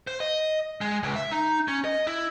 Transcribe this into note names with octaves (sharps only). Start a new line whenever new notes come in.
C5
D#5
G#3
C#2
E5
D#4
C#4
D#5
E4